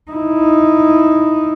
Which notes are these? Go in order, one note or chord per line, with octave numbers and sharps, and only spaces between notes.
D#4 E4